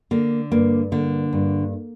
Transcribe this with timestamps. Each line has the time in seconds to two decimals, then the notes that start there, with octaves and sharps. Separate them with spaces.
0.11 D3 A#3
0.52 G2 A#3
0.92 D3 A#3
1.33 G2